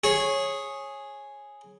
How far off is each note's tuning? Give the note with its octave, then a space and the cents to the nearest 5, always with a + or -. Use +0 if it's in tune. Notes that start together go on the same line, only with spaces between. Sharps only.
G#4 +0 C#5 -15